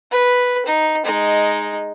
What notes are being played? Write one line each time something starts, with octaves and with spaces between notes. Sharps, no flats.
B4
D#4
G#3 D#4